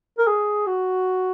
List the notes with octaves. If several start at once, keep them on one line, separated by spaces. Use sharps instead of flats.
A#4
G#4
F#4